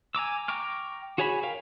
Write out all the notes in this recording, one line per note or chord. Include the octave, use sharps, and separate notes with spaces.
G#5 A#5 D6 E6
G5 A#5 C#6 D6 F6
F#4 G#4 C#5 G#5 B5
A#4 C#5 F5 G5